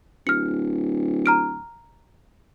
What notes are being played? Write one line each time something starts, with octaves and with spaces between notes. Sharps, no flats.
D1 F6 C#7
A#5 F6 D7